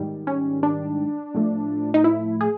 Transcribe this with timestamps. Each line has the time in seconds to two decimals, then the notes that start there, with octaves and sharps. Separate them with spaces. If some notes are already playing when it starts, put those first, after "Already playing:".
Already playing: G#2 D#3 G3
0.27 C#4
0.63 D4
1.35 A2 F3 A3
1.94 D#4
2.04 E4
2.41 G#4